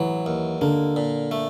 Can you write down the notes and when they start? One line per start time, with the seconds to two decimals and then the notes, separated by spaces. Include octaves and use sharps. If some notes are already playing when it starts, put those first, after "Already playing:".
Already playing: A1 E3 F#3
0.26 D#2
0.61 D3 A#3
0.96 A#2
1.31 A3